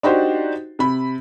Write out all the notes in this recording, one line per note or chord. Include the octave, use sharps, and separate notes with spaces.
D4 D#4 F#4 G4 C5
C3 B5